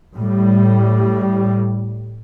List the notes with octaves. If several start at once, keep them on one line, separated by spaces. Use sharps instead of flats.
A2 G3